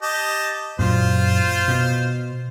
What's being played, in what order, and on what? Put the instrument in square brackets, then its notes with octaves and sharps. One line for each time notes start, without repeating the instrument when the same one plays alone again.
[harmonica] G4 D#5 A5
[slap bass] F#2 A#2 [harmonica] F4 C5
[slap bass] B2